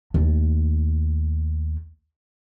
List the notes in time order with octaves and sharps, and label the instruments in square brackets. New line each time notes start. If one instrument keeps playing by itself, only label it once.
[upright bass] D#2 A3